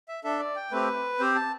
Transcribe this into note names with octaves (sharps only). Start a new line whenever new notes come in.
E5
D4 A4 E5
D5
G5
A3 C4 G4 B4
C4 G4 C5
A5